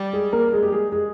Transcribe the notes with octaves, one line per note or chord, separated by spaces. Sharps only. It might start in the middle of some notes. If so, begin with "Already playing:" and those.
Already playing: G3
G#3 G#4
A#3 A#4
G#3 G#4
G4
G#3 G#4
G#3 G#4